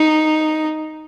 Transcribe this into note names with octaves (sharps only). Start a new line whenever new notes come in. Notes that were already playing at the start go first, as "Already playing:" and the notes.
Already playing: D#4